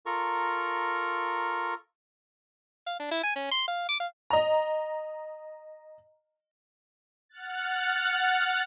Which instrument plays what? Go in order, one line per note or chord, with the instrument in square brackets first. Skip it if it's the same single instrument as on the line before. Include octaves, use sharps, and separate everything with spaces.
[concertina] F4 A4 A#4 A#5 C#6
[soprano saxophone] F5
D4
E4
G#5
C#4
C6
F5
D6
F5
[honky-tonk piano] D#5 A#5
[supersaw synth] F#5 F6 F#6 A6